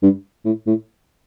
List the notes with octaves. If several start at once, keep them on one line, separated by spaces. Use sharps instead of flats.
G2
A2
A2